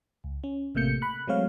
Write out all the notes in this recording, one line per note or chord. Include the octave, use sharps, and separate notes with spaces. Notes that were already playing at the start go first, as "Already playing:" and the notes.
C#2
C#4
A1 C3 A3 A#3 G6 C#7
B5 F#6
F#3 G#3 A3 C4 C#5 F5